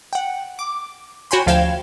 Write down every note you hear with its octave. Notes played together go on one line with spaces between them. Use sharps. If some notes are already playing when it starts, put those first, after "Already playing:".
F#5 G5
D6
F#4 C#5 G5 G#5 B5 C6
D2 F3 F5 G5 G#6 E7